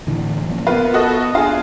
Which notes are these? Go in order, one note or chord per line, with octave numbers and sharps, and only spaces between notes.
A2 D3 E3
F3 A#3 C#4
A#3 B3 F4 B4
F#4 A4 D#5
D4 F4 G#4